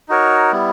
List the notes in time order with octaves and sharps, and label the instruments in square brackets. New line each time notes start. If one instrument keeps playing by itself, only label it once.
[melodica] D#4 F#4 A#4 C#5
G3 B3 E4